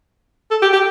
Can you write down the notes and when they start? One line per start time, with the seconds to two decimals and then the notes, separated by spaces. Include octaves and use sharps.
0.51 A4
0.62 G4
0.73 G4